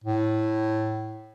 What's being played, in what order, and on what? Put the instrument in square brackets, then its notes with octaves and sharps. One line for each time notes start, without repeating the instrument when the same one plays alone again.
[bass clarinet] A2